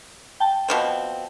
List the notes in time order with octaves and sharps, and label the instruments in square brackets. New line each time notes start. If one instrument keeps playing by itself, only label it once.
[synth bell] G5 A5
[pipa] B2 F3 C4